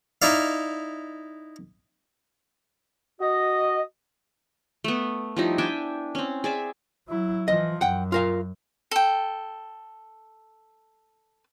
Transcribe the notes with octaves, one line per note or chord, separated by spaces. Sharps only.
D#4 E4 D5 F5
F#4 D#5
A3 B3
F3 G3 D#4 E4
D4 E5 G5 G#5
C4 C#4
G#4 D5 E5
F#3 E4
E3 F3 D#5
F#2 F#5 G5
F4 A#4 F5
A4 G5